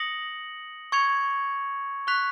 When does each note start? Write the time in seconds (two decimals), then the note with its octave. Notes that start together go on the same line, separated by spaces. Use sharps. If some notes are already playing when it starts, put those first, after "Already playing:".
Already playing: D#6 A#6 C#7 F#7
0.92 C#6 G#6 C#7 F7
2.07 C#6 F#6 B6 F7